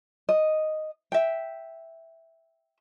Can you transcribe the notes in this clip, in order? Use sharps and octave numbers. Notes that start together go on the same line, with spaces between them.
D#5
E5 G5